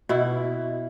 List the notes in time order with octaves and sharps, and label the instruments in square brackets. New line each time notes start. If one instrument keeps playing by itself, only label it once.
[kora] B2 E4